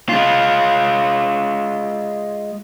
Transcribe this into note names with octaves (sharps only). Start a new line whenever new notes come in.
G#3 F4